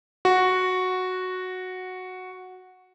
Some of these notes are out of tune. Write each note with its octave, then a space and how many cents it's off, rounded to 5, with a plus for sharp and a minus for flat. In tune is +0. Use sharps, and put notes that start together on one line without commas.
F#4 -5